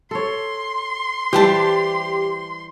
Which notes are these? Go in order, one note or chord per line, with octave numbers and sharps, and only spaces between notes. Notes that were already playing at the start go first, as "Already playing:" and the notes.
A4 C#5 C6
E3 G3 G4 C5 G5 A5